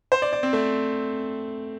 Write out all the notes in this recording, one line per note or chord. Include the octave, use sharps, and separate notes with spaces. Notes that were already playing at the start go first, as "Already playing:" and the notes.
C5
D5
D5
C4
A3